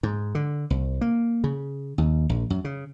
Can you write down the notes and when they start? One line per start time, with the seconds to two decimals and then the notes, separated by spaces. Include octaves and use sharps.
0.03 G#2
0.35 D3
0.70 C2
1.01 A#3
1.44 C#3
1.98 D#2
2.29 A#1
2.50 F#2
2.64 C#3